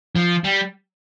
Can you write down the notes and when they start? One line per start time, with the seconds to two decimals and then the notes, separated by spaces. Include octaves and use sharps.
0.16 F3
0.44 G3